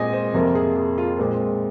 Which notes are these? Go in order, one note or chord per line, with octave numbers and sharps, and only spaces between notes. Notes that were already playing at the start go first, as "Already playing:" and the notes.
Already playing: A#2 G#3 C4 D#5 G#5
C5
F2 C3 F3 A#3 A#4
G#4
G#4
F4
A#2 G#3 C4